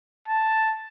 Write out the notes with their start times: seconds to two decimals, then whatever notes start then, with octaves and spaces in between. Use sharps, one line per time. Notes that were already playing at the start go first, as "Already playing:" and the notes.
0.29 A5